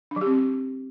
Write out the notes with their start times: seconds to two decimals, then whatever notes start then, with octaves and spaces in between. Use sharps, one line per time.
0.11 D4
0.16 F#3
0.21 G4
0.26 C4